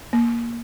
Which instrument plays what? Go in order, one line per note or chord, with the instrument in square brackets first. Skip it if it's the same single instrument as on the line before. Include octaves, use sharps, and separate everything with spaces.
[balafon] A#3